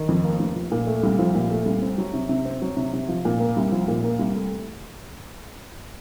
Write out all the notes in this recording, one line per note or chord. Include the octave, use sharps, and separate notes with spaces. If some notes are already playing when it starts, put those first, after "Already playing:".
Already playing: D#3
F2
A#3
F1
F3
A#2
A3
C2
F3
A#2
A3
C2
C4
F#3
C3
C3
C4
F#3
C3
C3
F3
A#2
A#3
C2
F3
A#2
A#3
C2
A3